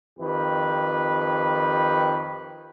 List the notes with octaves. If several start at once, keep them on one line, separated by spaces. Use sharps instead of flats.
F2 D#3 G4 B4